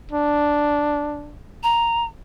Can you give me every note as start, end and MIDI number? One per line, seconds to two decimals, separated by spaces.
0.11 1.38 62
1.63 2.04 82